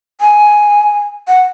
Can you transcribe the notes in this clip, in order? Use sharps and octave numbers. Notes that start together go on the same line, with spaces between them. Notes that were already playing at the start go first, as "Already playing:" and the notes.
G#5
F#5